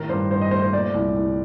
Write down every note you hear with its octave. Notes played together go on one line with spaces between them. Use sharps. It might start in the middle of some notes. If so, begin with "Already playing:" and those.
Already playing: A2 D#3 A#4
G2 C5
G2 C5
D#5
A3 C5
C5
A#2 D5
C2
C2